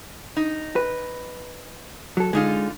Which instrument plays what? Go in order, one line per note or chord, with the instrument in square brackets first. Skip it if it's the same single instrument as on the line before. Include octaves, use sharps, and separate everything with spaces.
[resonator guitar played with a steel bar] D#4
[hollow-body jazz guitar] B4
F#3 A4
[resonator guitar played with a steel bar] D3 D#4 F4 [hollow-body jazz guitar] G#3